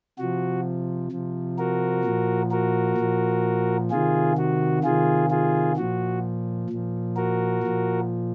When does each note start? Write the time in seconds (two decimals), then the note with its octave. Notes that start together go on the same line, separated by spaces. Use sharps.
0.19 C3 F3 F#4
1.12 C3 F3
1.59 F#4 A#4
2.05 A#2 F3
2.51 F#4 A#4
2.98 A#2 F3
3.91 C3 D#3 F4 G#4
4.37 F#4
4.84 C3 D#3 F4 G#4
5.31 F4 G#4
5.77 A#2 F3 F#4
6.70 A#2 F3
7.17 F#4 A#4
7.63 A#2 F3